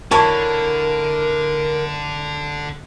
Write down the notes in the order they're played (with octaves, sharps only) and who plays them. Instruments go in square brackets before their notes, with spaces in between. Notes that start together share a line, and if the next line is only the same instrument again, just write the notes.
[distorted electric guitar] D3 [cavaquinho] E4 C#5 [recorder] A#4 [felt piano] A5